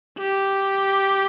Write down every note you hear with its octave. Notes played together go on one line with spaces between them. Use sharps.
G4